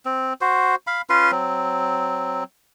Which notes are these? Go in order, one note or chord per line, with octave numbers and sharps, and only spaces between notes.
C4
F#4 C5
F5 B5
C#4 F4 B4 C6
F#3 C4